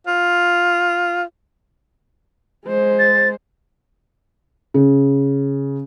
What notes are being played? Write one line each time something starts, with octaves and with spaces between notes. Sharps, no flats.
F4
G#3 C5
A6
C#3